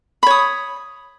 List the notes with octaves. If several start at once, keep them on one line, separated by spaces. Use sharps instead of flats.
C#5 B5 D#6